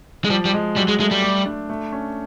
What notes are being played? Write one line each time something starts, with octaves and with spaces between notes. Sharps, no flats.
G#3
F3 G3
G3
G#3
F#3 G3
G#3
G#3 A3
G3
A3
D4
A3
C#4